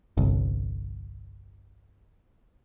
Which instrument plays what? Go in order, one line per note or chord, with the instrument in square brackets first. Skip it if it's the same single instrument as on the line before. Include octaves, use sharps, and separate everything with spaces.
[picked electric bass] G1 C2